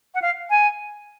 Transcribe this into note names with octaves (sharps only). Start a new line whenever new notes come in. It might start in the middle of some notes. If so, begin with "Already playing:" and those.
F#5
F5
G#5